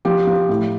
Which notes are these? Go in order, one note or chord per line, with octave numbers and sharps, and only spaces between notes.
F3 G4
F3
A2